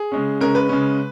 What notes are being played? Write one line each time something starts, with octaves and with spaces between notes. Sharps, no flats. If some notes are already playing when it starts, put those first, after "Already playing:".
Already playing: G#4
C#3 G#3 C#4
C#3 G#3 C#4 A#4
B4
C#3 G#3 C#4